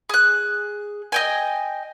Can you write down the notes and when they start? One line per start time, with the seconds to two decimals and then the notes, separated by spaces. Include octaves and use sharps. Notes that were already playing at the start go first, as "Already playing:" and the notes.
0.09 G#4 F#6
1.12 D#5 G5 G#5